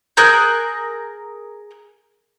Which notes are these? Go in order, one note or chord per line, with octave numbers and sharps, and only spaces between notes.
G#4 A#4 F#6 G6